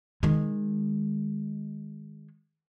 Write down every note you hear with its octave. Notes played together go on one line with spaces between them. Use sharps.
D#3 G#3